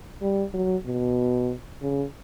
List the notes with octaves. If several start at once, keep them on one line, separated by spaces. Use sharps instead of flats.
G3
F#3
B2
C#3